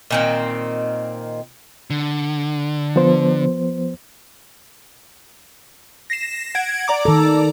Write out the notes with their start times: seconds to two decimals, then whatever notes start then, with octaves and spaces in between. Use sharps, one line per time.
0.11 A#2 D#3 C4
1.90 D3
2.96 F3 B3 C5
6.10 A#6 C7 E7
6.55 F#5 G#6 D7
6.88 D5 A#5 D6
7.05 D#3 A4